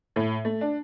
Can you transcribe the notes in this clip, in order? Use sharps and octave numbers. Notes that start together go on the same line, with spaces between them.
A2
A3
D4